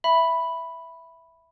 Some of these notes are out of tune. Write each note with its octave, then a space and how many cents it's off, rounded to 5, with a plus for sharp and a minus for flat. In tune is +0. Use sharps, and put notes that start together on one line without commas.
E5 +0 B5 +0